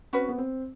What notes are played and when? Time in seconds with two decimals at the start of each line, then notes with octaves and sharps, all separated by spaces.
0.13 C4 C#4 F#4 B4
0.29 B3
0.38 C4